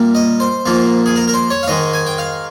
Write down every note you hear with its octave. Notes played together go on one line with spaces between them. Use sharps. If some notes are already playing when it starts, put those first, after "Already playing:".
Already playing: A#2 G3 A#3
D#5
C5
G#2 F3 A#3
G#4
A#4
A#4
C5
C#5
F5
G#2 D#3 G#3 D#5
G#5
G5
F5